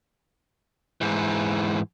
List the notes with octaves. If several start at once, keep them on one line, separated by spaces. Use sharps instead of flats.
G#2 E3